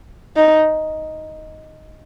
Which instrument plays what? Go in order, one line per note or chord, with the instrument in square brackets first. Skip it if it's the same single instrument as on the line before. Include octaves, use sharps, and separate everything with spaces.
[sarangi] D#4